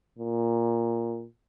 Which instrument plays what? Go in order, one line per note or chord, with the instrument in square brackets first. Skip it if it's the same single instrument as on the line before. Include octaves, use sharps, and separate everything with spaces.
[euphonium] A#2